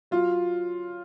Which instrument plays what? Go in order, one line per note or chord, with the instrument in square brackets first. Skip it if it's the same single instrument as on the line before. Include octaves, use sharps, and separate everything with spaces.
[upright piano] F#3 F4